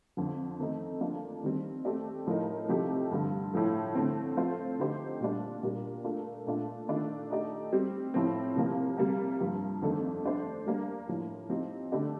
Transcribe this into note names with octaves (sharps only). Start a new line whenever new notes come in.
F2 D3 F3
D#3 A3 C4 D#4 A4
F3 A#3 D4 A4
D#3 G3 C4
A3 C4 G4 D5
A2 F3 A3 D#4 A#4
C3 F3 A3 D#4 G4
G2 D3 F3
A2 F3 A3
D3 A3 C4
F3 C4 F4 A4 C5
D3 A3 D#4 G4 C5
A#2 G3 D4
A#2 G3 D4 G4 A#4
A3 D4 F4 A#4
A#2 A3 D4 F4
D#3 A3 D4 F4
A3 D#4 G4 D5
G3 C4 G4
A2 F3 C4
C3 F3 A#3
C3 G3 A#3
G2 F3 A#3
F2 D#3 A3 D4 A4
G3 D4 A4 C5
G3 A#3 D4
A2 F3 A#3
F3 C4 D#4 G4
D3 A3 D4 G4 D5